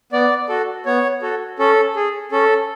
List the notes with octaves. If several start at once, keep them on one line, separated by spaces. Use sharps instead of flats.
B3 D5
F#4 A4
B3 C#5
F#4 A4
C#4 A4
G#4
C#4 A4